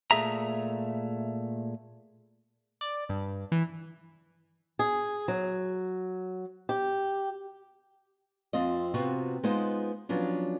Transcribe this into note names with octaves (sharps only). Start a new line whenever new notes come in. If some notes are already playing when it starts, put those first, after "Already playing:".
A#2 A3 G#4 E5 A#5
D5
G2
E3
G#4
F#3
G4
F2 C4 F4 D#5
C3 B3 C4 F4 F#4
G#3 B3 D#4 F4 C5 D#5
F3 F#3 B3 C#4 D4